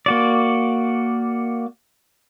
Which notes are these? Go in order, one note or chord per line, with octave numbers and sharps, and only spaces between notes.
A#3 F#4 D5